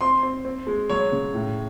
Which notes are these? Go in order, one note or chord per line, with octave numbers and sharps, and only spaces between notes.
C4 C6
C4
C4
G#3
F#3 C#5
C#3
A2